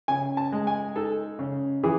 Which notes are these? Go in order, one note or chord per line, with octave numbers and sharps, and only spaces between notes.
C#3 G#5
A5
G#3
G#5
D#4 A4
C#3
E3 G#4